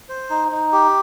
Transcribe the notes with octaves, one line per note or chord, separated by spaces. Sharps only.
C5
D#4
D#4
G4